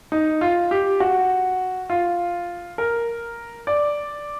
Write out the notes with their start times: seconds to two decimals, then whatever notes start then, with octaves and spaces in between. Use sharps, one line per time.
0.12 D#4
0.41 F4
0.71 G4
1.00 F#4
1.90 F4
2.78 A#4
3.67 D5